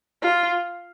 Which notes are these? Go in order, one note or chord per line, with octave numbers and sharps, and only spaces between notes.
F4